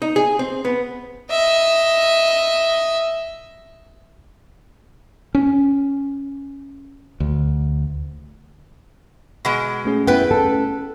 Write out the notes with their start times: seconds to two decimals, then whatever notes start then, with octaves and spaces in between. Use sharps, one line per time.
0.02 D#4
0.16 G#4
0.39 C4
0.65 B3
1.30 D#5 E5
5.35 C#4
7.20 D2
9.45 B2 G#3
9.85 A3 C#4 G#4
10.07 B3 E4 B4 G5
10.31 A4